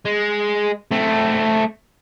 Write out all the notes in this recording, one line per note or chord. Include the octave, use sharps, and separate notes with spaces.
G#3
A3 C4